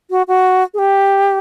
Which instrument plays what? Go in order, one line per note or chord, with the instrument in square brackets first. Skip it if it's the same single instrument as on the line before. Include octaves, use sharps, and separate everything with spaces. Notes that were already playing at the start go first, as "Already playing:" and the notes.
[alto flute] F#4
F#4
G#4
G4